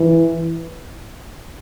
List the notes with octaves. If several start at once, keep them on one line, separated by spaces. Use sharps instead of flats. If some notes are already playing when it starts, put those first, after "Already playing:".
Already playing: E3